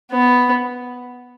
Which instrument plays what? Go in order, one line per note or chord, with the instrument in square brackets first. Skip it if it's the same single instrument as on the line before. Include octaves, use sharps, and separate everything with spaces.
[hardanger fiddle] B3